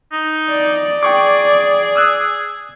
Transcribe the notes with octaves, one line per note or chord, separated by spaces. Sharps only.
D#4
D5
G#4 G5 C#6 D6
D#6 E6 F#6